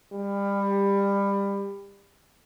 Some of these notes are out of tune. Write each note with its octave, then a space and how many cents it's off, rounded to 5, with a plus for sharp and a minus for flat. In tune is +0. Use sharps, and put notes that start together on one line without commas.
G3 +25